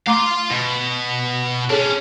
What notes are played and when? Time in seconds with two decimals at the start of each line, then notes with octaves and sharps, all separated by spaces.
0.07 A3 F5 A#5 C6 D6
0.51 B2
1.70 C#4 D4 G#4 A4 C#5